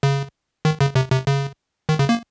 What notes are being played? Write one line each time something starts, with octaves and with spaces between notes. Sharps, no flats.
C#3
D#3
C#3
C3
C3
C#3
D#3
C#3
A#3